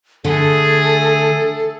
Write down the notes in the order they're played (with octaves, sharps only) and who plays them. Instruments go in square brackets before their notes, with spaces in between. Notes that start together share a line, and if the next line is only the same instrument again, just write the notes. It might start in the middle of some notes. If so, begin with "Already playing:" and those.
[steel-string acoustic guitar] D3 [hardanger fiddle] A3 G#4 [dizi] A4